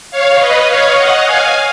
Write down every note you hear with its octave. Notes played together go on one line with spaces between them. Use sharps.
C#5 F5
B4 D#5
C#5 F5
D#5 F#5
F5 G#5